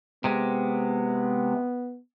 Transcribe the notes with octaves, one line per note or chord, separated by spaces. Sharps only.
C3 G#3 B3